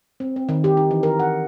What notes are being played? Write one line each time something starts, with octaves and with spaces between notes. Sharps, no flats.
C4
C4
D#3
G4
D#4
E3
A#4
F#5